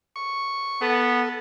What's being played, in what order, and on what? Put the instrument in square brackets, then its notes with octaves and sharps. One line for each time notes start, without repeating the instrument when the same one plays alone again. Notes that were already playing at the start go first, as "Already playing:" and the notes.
[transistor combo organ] C#6
[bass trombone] B3 [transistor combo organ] A4